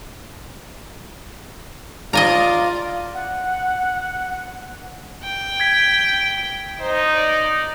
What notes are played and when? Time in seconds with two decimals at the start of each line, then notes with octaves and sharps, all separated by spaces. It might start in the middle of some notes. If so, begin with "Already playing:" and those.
2.13 F4 D5 D#5 G#5 A#5
3.14 F#5
5.23 G5
5.60 G#6 B6
6.80 D#4 C5
7.16 D5